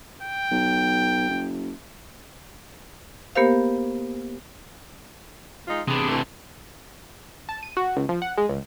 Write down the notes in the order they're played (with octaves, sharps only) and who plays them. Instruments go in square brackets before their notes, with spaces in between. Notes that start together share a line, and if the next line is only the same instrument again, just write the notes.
[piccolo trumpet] G5
[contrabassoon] B1
F#1
[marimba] A#3 B3 G4 A#4 C5 F5
[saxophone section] G#3 D#4 F4
[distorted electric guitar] C3 D4 [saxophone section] B3 G#4
[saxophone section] E3 A3
[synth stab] A5
D#7
F#4
C#2
F3
F#5
G#3
C#2